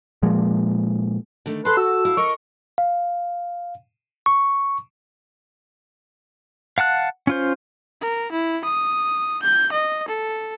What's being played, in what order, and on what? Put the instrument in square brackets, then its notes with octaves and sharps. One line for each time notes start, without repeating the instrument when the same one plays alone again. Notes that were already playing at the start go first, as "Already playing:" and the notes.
[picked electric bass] A#2 F3 G#3
[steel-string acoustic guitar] D3 D#3 A3
[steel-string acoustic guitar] A4 A5 [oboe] B4 [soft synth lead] C6
[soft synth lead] F#4 [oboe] E6
[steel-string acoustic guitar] E4 F5
[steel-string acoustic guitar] A#4 D#5 [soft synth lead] C#6
[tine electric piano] F5
C#6
[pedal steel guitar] F5 F#5 A5 F#6
C#4 F4 C5
[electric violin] A#4
E4
D#6
G6
D#5
A4